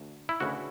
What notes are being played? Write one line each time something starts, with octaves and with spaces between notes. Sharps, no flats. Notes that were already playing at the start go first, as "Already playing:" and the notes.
Already playing: D2
E4
D2 C#3 E3 F#4